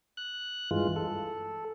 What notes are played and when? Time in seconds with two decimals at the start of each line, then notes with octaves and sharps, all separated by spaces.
0.17 F#6
0.71 G2 E3 G#3 F4
0.96 A4